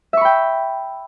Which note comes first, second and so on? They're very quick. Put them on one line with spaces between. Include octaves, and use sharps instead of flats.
E5 C#6 B5 G5